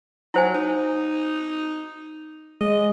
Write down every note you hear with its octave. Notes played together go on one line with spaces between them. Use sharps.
F#3 E4 C5 G#5
D#4
G#3 D#5